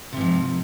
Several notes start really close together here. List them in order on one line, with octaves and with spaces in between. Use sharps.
C3 G#2 F3